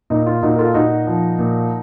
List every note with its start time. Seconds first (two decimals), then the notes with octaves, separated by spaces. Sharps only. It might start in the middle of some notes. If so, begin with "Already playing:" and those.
0.10 A#2 D#4
0.26 F4
0.42 A#2 D#4 F#4
0.54 A#4
0.58 F4 A4
0.74 A#2 D#4 F#4
1.07 F3
1.39 A#2